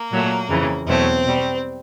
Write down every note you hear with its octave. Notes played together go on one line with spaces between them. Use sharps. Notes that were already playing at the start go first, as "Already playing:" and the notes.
Already playing: A#3
A#2 F#3 A3
F2 C#3 E3
E2 B2 F#3 A3 C4
B2 G3